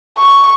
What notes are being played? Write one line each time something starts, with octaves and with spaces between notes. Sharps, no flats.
C#6